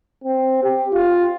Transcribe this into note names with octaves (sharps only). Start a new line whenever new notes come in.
C4
G4
F4